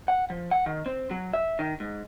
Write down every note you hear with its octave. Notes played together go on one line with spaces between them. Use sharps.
F#5
F3
F#5
D#3
C4
F#3
E5
D#3
G#2